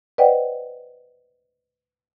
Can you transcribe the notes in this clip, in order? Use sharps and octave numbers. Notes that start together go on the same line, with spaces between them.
B4 C5 D5 D#5 F#5 G5